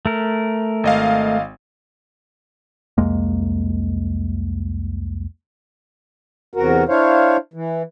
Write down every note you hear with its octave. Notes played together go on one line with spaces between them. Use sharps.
A3 A#4
G#1 D#5 F5
C2 F2 G#3 A#3
E2 C3 F#4 A#4
D4 E4 C5 C#5 F5
E3